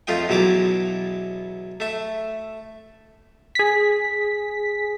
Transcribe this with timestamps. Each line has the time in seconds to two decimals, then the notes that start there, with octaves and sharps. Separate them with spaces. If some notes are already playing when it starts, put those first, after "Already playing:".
0.07 F2 A3 F4 D#5 G5
0.28 E2 B2 F#3 E4 A#5 D6
1.80 A3 E5
3.55 G#4 B6